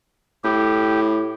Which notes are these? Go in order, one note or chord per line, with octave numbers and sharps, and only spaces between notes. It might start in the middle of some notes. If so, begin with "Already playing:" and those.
A2 G4